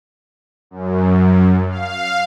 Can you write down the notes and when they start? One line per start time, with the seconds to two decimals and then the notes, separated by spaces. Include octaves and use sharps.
0.71 F#2
1.69 F5